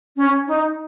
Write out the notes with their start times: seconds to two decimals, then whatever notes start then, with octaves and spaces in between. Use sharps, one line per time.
0.17 C#4
0.47 D#4